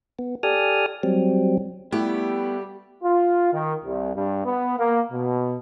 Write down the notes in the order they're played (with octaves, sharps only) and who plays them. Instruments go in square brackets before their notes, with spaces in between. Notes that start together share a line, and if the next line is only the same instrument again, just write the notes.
[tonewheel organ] B3
G4 A4 D5 G#5 D#6 F6
F#3 G3 C4
[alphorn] G3 [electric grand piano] A3 E4 [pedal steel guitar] B3 [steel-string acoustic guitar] G4
[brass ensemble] F4
D#3
C2
G2
B3
A#3
B2